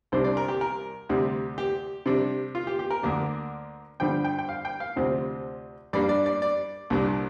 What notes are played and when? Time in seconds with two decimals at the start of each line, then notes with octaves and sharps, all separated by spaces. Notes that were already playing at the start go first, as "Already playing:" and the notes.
0.12 C2 C3 G3 D4 C5
0.24 D5
0.37 A#4
0.48 G4
0.61 A#4
1.09 D2 C3 G3
1.58 G4
2.06 C3 G3 D4
2.55 F4
2.67 G4
2.79 G4
2.91 A#4
3.03 D2 D3 A#3 D4
4.00 G2 D3 F3 D4 G5
4.24 G5
4.39 G5
4.49 F5
4.65 G5
4.80 F5
4.96 D2 C3 F3 C4
5.93 G2 G3 A#3 D4 D5
6.09 D5
6.26 D5
6.42 D5
6.90 C2 A#2 G3 D4